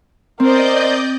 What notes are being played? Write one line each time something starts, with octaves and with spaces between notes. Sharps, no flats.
C4 A#4 C5 D5 D#5 G6